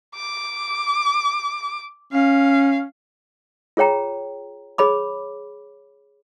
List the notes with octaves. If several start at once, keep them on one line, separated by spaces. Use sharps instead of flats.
D6
C#4 F5
F4 G#4 C#5 G5 A#5
G#4 C#5 B5 D6